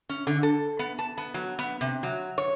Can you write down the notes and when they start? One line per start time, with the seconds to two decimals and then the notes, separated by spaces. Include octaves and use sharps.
0.09 C#4
0.27 D3
0.43 A4
0.79 B3
0.99 A5
1.18 B3
1.34 F#3
1.59 B3
1.81 C3
2.03 F#3
2.38 C#5